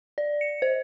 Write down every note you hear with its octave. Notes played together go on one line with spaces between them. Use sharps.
D5
C#7
C5